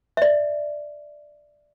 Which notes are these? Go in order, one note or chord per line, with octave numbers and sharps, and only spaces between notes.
D5 E5